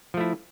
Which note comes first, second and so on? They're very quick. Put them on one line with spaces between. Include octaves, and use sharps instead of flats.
F3 A3 E4